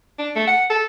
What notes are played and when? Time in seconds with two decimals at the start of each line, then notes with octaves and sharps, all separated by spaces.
0.18 D4
0.35 A3
0.47 F#5
0.70 A4